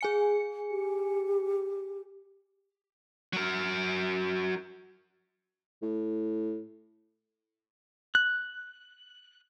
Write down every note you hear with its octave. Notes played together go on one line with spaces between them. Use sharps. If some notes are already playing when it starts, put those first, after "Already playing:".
G#4 G#5 C#7
G4
F#3 A#4
A2
F#6